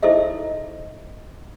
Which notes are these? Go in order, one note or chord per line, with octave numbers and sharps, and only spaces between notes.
D#4 E4 A4 C5 D#5 E5